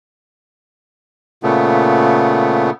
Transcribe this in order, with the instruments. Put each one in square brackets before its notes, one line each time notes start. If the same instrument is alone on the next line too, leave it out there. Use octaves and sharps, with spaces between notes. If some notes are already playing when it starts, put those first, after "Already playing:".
[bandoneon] A#2 C#3 A3 B3